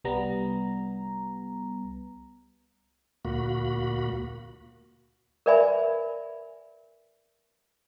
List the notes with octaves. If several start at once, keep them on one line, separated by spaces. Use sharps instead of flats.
C2 G3 B3 A#5
D2 A#2 A#3 F#4 B5
A#4 B4 D5 E5 G#5 B5